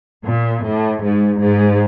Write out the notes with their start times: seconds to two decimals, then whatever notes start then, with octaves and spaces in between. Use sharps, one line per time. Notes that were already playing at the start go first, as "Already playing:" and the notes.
0.24 A#2
0.62 A2
1.02 G#2
1.41 G#2